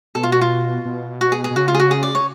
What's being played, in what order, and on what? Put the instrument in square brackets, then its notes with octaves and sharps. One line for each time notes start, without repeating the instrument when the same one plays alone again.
[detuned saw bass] B2 [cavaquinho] A4
[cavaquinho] F4
F#4
F4
[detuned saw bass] B2
[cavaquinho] F#4
G#4
G#4
[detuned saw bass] B2
[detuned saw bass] C#3 [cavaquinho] F#4
[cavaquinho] F4
G#4
F#4
G#4
D5
C#5